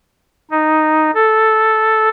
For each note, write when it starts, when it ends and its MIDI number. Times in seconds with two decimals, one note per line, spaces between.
0.51 1.11 63
1.14 2.09 69